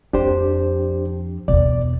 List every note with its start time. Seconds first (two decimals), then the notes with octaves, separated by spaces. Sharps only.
0.13 F2 D4 G4 C5
1.48 E2 B2 D5